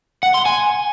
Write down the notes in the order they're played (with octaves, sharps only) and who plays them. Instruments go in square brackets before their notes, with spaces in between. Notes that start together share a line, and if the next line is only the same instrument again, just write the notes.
[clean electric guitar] F#5
C6
G#5